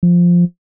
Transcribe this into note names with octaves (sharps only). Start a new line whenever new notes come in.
F3